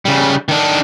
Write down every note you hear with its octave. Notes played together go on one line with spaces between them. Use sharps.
C#3 G3
D#3 D4